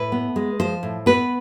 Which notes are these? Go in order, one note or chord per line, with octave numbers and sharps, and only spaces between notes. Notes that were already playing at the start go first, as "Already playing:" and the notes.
Already playing: A2 B4
B3
G#3
F3 C5
A2
B3 B4